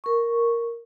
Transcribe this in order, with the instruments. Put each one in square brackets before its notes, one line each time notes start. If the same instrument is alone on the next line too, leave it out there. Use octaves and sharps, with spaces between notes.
[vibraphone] A#4 C#6